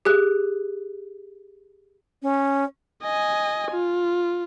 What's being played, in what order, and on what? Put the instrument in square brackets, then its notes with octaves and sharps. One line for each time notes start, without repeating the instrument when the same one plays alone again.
[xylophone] G4 G#4 F#6
[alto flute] C#4
[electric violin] D#5 G#5
F4